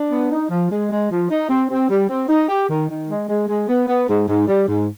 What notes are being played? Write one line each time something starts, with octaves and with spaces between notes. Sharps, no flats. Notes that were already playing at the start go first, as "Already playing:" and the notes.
Already playing: D4
B3
D#4
F3
G#3
G#3
F3
D#4
C4
C4
G3
C4
D#4
G4
D#3
D#3
G#3
G#3
G#3
B3
B3
G#2
G#2
G3
G#2